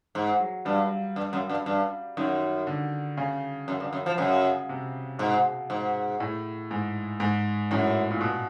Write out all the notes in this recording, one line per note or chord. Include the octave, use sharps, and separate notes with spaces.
G#2
F#3
G2 G3
G2
F#2
G2
G2
F#2 D#3
D3
C#3
F#2
G2
F#2
F3
F#2 C#3
C3
G#2 B2
G#2
A2
G#2
G#2
F#2 A2
A#2
B2